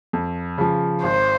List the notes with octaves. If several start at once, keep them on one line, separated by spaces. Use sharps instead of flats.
F2
C#3 F3
G#1 C5